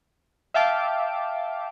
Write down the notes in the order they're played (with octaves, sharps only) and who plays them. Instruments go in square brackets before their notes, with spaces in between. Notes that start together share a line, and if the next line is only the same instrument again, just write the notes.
[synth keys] E5 F5 G5 A5 D6